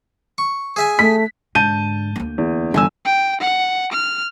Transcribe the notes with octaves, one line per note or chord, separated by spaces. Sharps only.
C#6
G#4 E5 G#5
A3 B6
G#2 D3 A5 G6 D#7
D2 A#3
E2
G1 E3 G3 G#5 E6
G5
F#5
F6